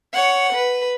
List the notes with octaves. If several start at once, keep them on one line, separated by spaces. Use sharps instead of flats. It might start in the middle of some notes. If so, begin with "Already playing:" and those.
C#5 F#5
B4